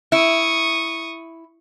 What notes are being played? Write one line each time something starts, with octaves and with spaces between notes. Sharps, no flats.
E4 C#6 D#6